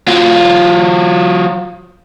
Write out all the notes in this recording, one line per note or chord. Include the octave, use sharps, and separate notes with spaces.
F#3 F4